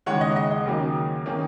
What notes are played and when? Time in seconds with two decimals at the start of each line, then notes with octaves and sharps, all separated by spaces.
0.06 D#2 C#3 G#3 C#5 F#5
0.21 D#5
0.36 D#5
0.51 D#5
0.66 D#2 C#3 F#3 A#3 C#4
1.26 D#3 A#3 C#4